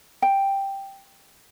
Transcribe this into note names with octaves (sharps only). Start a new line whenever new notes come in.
G5